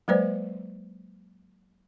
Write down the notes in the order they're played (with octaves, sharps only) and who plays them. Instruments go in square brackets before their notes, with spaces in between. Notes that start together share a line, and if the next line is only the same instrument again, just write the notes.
[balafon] F#3 G#3 A#3 B4 C5 D5